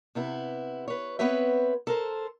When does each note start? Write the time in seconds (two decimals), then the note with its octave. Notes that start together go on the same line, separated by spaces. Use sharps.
0.15 C3 B3 E4
0.88 B4 C#5
1.19 B3 C4 B4 C#5 E5
1.87 A4 A#4 C5